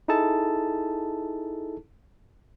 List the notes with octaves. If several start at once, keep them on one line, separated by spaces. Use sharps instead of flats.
D#4 E4 G#4 A4 A5